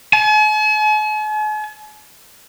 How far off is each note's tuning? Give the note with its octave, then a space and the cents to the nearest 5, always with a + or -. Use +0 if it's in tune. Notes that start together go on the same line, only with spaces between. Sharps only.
G#5 +45